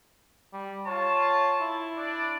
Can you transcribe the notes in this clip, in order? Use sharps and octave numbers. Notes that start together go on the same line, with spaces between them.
G3
F4 C#5 A5
E4
D4 D5